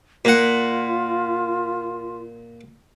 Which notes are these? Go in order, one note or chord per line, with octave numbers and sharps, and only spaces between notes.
A#2 F4 F#5